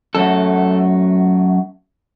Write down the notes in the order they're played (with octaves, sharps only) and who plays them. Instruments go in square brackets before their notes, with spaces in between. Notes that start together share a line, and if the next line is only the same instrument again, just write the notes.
[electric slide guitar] F#2 F#3 A3 A4